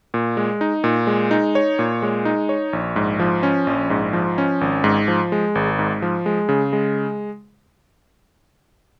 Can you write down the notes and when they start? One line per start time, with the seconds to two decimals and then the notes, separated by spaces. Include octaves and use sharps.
0.14 A#2
0.37 G#3
0.61 D#4
0.84 A#2
1.07 G#3
1.31 D#4
1.55 C#5
1.79 A#2
2.02 G#3
2.25 D#4
2.49 C#5
2.73 A#1
2.96 G#2
3.20 F3
3.43 C#4
3.67 A#1
3.90 G#2
4.13 F3
4.38 C#4
4.61 G#1
4.84 G#2
5.08 F3
5.32 G#3
5.55 G#1
5.79 G#2
6.02 F3
6.26 G#3
6.49 C#3
6.73 G#3